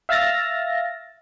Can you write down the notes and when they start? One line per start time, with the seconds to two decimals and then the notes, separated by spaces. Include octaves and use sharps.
0.09 E5 F5 E6 F6 A6 A#6